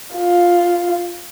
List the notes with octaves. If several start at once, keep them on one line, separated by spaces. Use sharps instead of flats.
F4